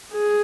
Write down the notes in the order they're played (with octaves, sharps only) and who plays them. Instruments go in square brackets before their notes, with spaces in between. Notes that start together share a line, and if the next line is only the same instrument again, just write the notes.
[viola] G#4